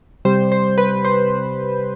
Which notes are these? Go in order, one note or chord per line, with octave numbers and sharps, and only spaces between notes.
C3 G3 C5
C5
B4
C5